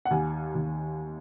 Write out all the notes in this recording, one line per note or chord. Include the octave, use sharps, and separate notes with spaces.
F#5
D#2 G#5
D#2